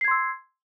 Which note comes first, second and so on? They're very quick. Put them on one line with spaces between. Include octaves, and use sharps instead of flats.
C7 G#6 C6 E6